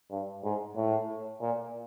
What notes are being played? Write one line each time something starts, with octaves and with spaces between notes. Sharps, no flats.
G2
G#2
A2
A#2